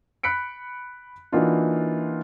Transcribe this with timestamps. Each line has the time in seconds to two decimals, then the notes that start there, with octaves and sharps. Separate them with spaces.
0.23 B5 F#6 B6 C#7 D7
1.32 E3 A#3 D4 D#4 F4 F#4